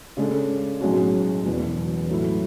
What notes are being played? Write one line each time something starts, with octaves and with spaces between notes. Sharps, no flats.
C#3 G#3 D4 A4
B1 A2 G#3 C#4 F#4
E1 E2 B2 F#3
A2 F#3 A3 E4